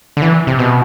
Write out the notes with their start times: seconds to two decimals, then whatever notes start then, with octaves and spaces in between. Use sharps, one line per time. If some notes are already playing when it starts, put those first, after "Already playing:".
0.17 D3
0.22 E3
0.47 C3
0.59 B2